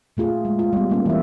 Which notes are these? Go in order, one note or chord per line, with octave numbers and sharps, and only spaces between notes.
A#2 A3 F4 G#4
G#3
F4
G3 B3
G3 A#3 C#4
E3 E5